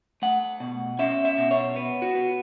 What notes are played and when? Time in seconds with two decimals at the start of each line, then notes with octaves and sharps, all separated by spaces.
0.22 A3 F#5
0.60 B2
0.99 C#4 E5
1.25 E5
1.38 B2
1.51 C#5
1.76 B3
2.02 F#4
2.15 B3